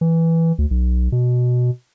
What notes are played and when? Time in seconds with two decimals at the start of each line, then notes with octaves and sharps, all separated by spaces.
0.01 E3
0.58 D2
0.71 B1
1.12 B2